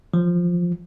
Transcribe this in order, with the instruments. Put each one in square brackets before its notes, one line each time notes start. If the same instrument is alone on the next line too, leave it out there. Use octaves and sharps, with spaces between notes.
[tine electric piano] F3